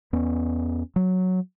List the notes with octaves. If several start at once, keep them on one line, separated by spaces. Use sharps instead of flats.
E2 B3 C#4
F#3